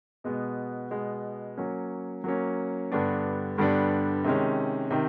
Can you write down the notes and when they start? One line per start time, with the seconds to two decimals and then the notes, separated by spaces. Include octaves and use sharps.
0.24 B2 G#3 B3
0.91 B2 G#3 B3
1.58 F#3 A#3 C#4
2.24 F#3 A#3 C#4
2.92 G2 D3 G3 B3 D4
3.58 G2 D3 G3 B3 D4
4.24 C3 D#3 G#3 C#4
4.91 C3 D#3